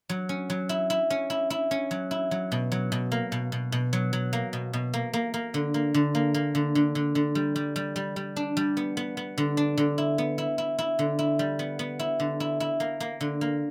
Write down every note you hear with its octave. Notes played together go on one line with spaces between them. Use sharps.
F#3
C#4
F#3
E4
E4
C#4
E4
E4
C#4
F#3
E4
F#3
B2
F#3
B2
A#3
B2
B2
B2
F#3
F#3
A#3
B2
B2
A#3
A#3
A#3
D3
A#3
D3
A#3
A#3
D3
D3
D3
D3
G3
G3
G3
G3
G3
D4
G3
B3
B3
B3
D3
D4
D3
E4
B3
E4
E4
E4
D3
E4
G3
B3
B3
E4
D3
E4
E4
A#3
A#3
D3
A#3